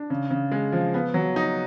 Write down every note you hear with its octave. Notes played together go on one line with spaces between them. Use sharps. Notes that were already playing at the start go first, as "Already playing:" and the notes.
Already playing: D4
C#3
C#3
G#3
F3
B3
F#3
D#4